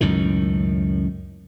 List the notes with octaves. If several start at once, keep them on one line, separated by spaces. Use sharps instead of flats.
C#2 F#2 A2 D#3